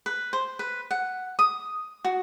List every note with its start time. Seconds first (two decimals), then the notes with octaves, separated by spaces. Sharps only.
0.06 B4
0.33 C5
0.59 B4
0.91 F#5
1.39 D#6
2.05 F#4